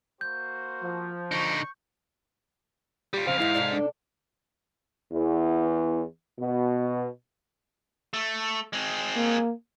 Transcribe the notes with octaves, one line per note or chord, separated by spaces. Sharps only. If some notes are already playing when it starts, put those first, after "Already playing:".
A#3 F#4 C5 G6
F3
D3 D#4 C#6
G3 F4 G4
F2 C#3 C5 F5
G#2 D#3 E3 E4
C3 A4 D5
D4
E2
B2
A3
G#3 C4
A#3